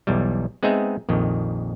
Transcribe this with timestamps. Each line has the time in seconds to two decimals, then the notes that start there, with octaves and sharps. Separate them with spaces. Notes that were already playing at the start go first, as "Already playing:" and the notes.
0.07 B1 E2 G3
0.63 G#3 B3 C4 D#4 G#4 E5
1.09 A#1 F2 D#3